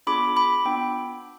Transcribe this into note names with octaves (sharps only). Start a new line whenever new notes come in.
B3 D4 F4 G#4 B5 D6
B5 D6
B3 D4 F4 G5 B5